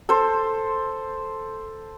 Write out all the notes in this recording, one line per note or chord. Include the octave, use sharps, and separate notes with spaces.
A4 C5